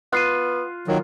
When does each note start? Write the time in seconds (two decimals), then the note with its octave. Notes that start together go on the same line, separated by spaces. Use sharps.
0.13 B3 F4 F#6 C7 D#7
0.88 A#2 D#3 F#3